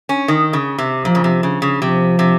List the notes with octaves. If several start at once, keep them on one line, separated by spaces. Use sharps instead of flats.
C#4
D#3
C#3
C3
A#2 F3
C#3
C3
C#3
C#3
C3 F3
C3